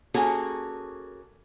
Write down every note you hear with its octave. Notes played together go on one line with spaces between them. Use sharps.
A#3 C#4 F#4 G#4 A4